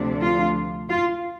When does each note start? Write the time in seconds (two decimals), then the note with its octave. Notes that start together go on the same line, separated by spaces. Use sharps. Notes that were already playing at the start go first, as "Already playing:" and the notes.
Already playing: D2 C3 F3 A3 D4
0.21 F4
0.89 F4